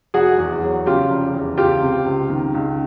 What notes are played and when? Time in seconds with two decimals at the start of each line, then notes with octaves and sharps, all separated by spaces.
0.14 F1 F#4 G#4
0.38 E2
0.63 F#3
0.86 C#3 F4 G4
1.10 F1
1.34 E2
1.57 C#2 F4 G4
1.82 C3
2.05 C#2
2.30 D#3
2.54 C#2